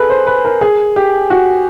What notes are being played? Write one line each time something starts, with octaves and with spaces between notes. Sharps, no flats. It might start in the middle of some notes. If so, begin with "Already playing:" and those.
Already playing: G#4 A4 B4
C5
B4
A#4
G#4
G4
F#4